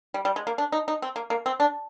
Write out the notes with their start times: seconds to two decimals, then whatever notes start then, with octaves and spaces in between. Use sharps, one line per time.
0.14 G3
0.25 G3
0.36 G#3
0.47 A#3
0.58 D4
0.72 D#4
0.88 D#4
1.02 C4
1.16 A#3
1.30 A#3
1.46 C4
1.60 D4